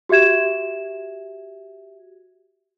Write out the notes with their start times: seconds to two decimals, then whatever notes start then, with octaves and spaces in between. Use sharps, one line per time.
0.09 F#4 G4 E5 G#6 E7